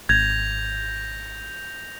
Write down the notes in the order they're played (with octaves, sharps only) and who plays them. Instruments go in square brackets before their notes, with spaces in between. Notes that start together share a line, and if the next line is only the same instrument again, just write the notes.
[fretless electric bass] G#1 [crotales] G6 A#6 F7 [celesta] G#6